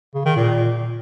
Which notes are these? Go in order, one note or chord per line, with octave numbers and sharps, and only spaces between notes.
C#3
D#3
A#2